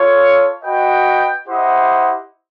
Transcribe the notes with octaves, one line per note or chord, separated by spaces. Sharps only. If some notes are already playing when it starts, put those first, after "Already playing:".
Already playing: F4 A4 C#5
F#4 B4 D#5 G5
E4 G4 C5 D#5 F#5